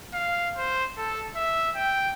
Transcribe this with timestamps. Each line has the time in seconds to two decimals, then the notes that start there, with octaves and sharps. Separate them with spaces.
0.14 F5
0.57 C5
0.97 A4
1.35 E5
1.76 G5